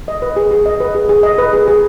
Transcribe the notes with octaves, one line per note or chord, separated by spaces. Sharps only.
D#5
B4
G#4
G#4
D#5
B4
G#4
G#4
D#5
B4
G#4
G#4